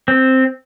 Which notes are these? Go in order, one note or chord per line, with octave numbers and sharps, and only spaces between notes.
C4